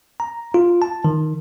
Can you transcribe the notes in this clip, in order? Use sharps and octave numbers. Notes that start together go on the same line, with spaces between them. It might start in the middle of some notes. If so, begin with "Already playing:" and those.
A#5
F4
A5
D#3